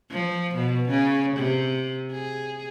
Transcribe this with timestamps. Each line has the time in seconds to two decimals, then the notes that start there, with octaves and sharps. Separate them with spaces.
0.11 F3
0.55 B2
0.89 C#3
1.36 C3
2.11 G#4